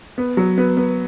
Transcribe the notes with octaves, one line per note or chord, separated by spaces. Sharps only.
B3
F#3
B3
B3